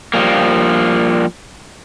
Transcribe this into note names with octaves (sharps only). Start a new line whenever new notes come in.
F3 G3 A#3